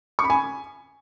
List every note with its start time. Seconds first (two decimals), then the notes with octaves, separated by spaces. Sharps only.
0.19 C#6
0.24 B5
0.30 G#5